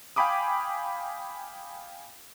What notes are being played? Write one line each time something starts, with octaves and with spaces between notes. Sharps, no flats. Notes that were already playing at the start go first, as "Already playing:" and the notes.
F5 G5 G#5 B5 D6 D#6